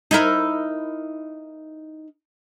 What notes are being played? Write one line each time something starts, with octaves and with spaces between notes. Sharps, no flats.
D#4 E4 A#4